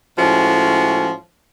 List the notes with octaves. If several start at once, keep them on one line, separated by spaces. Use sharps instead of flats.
A2 F3 G#3 A3 C#4 F#4